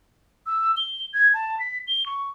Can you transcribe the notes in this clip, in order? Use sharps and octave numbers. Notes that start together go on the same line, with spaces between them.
E6
G7
G#6
A5
B6
G7
C#6